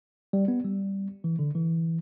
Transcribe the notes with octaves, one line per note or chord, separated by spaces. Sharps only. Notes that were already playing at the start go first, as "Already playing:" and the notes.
G3
B3
G3
E3
D3
E3